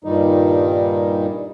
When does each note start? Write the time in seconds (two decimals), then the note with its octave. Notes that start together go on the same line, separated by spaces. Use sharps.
0.04 G2 A#2 D#3 G3 D#4